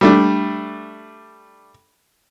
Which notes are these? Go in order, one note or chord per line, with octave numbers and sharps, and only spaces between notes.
G3 A3 D4